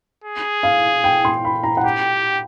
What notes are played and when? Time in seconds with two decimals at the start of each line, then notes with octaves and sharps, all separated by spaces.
0.24 G#4
0.63 F5
1.04 G5
1.25 C6
1.45 B5
1.63 A#5
1.77 F#5
1.84 G4 G5